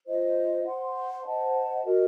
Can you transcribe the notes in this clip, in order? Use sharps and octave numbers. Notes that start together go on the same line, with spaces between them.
F4 C5 D#5
C5 F#5 C6
C5 D#5 F#5 A5
F#4 A#4 D#5